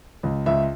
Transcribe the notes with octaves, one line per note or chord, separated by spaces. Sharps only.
C#2
C#2 E5